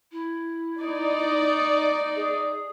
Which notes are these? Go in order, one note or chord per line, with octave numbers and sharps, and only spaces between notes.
E4
D#4 D5
G#4